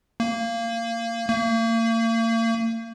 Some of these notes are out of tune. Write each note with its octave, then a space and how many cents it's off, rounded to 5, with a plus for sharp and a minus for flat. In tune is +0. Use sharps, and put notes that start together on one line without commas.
A#3 -20
A#3 -40